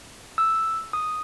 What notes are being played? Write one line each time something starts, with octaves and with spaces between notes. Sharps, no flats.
E6
D#6